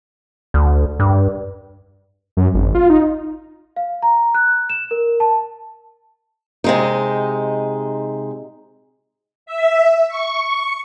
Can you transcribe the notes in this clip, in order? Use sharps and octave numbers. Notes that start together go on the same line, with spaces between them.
D2
G2
F#2
G#1
F4
D#4
F5
A#5
F#6
E7
A#4
A5
C3 G#3 D#4
E5
C#6